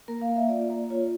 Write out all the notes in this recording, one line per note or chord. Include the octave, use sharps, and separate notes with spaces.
A#3 A#4
F5
A#3
E5
F4 D5
A#3
F4 C#5